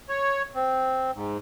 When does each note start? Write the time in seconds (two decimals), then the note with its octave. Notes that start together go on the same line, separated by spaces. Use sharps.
0.09 C#5
0.55 C4
1.15 G#2